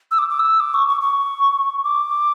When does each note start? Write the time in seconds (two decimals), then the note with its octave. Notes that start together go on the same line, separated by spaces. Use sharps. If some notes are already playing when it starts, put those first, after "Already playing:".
0.11 E6
0.19 D6
0.30 D6
0.39 E6
0.60 D6
0.74 C#6
0.88 C#6
1.01 C#6
1.84 D6